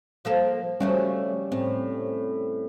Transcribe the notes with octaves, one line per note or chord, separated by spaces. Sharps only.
F3 A#3 A4
F3 G3 A3 C#4 F#4
A2 C4